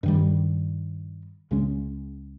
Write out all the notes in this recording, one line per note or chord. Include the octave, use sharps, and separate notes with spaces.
G2 D#3 G3
C#2 C#3 G#3 C#4